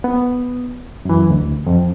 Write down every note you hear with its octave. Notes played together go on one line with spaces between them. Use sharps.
B3
F#2 E3
D2
F2